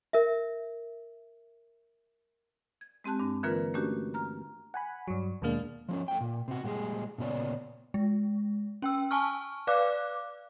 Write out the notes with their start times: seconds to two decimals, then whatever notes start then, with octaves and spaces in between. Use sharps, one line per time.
0.13 A#4 E5
2.81 G#6
3.04 G#3 C4 G4 A5 F#6
3.19 G2 D4
3.43 D3 E3 A#3 F4 A#4 B4
3.74 A3 C#4 D4 F#4 G4
4.14 A#5 F6
4.74 F#5 G#5 B5
5.08 G2 F#3
5.42 D#2 B2 G#3 A#3 D4
5.89 F3 C4 C#4
6.08 A3 G5
6.21 A#2
6.48 C3 F#4
6.64 A#2 G3 G#3 G#4
7.18 A#2 C#3 B3 C#5 D5
7.94 G#3
8.82 C#4 G5 E6
9.11 G#5 A5 C#6 F6
9.67 B4 D5 F5 D6 F#6